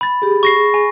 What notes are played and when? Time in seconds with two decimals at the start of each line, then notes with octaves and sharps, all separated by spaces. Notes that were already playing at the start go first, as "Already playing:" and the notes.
0.01 B5 A6
0.22 G4 G#4
0.43 C#6 A#6 C7
0.56 G#4
0.74 G#5